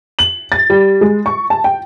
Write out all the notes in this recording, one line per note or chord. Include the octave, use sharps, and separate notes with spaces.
F#7
A6
G3
G#3
C#6
A5
G5